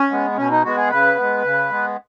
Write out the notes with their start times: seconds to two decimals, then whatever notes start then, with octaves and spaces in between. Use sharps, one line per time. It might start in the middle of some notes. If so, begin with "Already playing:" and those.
Already playing: C#4
0.11 G#3 B3
0.37 B2 C#4
0.51 D#4
0.64 G#3 B3 F#4
0.77 G#4
0.90 C#3 B4
1.16 G#3 B3
1.43 C#3
1.70 G#3 B3